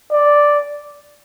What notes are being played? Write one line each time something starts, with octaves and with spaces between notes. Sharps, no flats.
D5